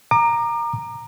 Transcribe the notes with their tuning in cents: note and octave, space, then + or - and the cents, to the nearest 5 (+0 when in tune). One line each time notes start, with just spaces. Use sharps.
A#5 +0 D6 +40